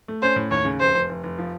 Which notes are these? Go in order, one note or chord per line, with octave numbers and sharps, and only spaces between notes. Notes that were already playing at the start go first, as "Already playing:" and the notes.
A3
C#4 C5
A2
D#2 C#5
C#3
F1 C5
F1
F1
F1
F3